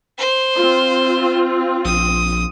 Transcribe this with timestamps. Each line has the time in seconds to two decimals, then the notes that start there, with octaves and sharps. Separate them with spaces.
0.18 C5
0.56 C4 F4
1.85 A#1 D#6